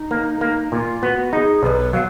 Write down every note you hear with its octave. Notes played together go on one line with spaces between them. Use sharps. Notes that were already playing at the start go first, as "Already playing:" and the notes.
Already playing: D#4
A#3
A#3
A#2 F4
B3 F#4
D#4 G#4
B1 B4 D5
F#3 F5